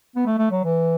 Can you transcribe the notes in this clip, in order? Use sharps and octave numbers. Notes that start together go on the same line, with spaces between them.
B3
A3
A3
F#3
E3